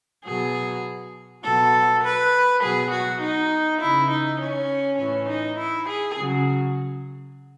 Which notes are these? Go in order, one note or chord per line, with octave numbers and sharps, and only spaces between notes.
B2 F#3 G#4
B2 F#3 A4
B4
B2 F#3 G#4
F#4
D#4
C#3 E3 E4
D#4
C#4
A2 E3 C#4
D#4
E4
G#4
C#3 F#3